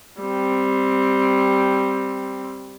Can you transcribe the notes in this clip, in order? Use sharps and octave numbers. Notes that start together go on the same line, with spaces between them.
G3 C4